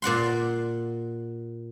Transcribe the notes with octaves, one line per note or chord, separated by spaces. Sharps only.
A#2 D5 F#5 C6